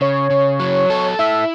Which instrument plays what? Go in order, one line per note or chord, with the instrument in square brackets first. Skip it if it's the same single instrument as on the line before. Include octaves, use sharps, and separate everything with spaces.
[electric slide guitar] C#3 [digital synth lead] C#5
[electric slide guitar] C#3
F#3
A4
[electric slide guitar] E4 [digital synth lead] E5